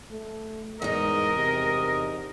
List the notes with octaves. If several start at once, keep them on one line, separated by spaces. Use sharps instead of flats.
A3
E2 G#2 D#4 A#4 D#5
C3